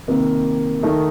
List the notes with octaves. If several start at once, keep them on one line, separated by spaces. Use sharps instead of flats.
C3 D#3 A#3
D#3 A3 D#4